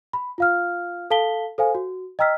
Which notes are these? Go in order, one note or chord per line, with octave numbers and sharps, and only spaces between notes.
B5
F4 F5 F6
A4 F5 A5 B6 G7
A4 C5 F5 G#5
F#4
D#5 G5 A#5 E6 F6 B6